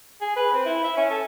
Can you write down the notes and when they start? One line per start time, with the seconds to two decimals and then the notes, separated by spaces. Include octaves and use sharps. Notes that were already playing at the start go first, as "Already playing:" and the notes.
0.21 G#4
0.36 B4
0.53 C4
0.66 E4
0.84 E5
0.97 C#4
1.11 A4